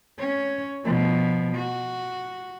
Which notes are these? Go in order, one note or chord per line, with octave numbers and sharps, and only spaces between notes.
C#4 C#5
B2 F3
F#4